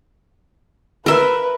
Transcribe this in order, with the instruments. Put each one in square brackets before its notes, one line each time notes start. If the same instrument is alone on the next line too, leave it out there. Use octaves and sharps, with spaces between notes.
[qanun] A#4 E5 [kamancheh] B4